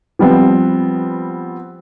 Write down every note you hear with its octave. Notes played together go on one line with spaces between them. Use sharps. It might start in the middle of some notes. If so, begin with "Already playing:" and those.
F3 G3 B3 C4